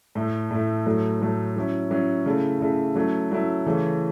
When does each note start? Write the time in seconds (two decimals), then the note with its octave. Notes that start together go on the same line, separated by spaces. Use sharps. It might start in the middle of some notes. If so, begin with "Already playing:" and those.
0.15 A2 A3 E4
0.51 A2 A3 E4
0.86 A2 F#3 A3
1.21 A2 F#3 A3
1.56 F#3 C#4 E4
1.91 F#3 C#4 E4
2.26 C#3 A3 E4
2.61 C#3 A3 E4
2.95 F#3 A3 C#4 E4
3.31 F#3 A3 C#4 E4
3.66 C#3 E3 A3 C#4